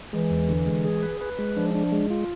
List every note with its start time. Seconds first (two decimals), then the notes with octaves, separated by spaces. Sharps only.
0.13 E3 G#3
0.30 E2
0.49 D3
0.66 G#3
0.85 G#4
1.03 B4
1.21 B4
1.39 G#3
1.57 F3 D4
1.75 D4
1.92 G#3
2.10 F4